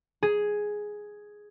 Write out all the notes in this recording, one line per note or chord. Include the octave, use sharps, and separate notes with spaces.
G#4